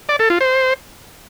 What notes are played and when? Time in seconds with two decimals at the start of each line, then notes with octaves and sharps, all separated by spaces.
0.09 D5
0.19 A4
0.30 F4
0.41 C5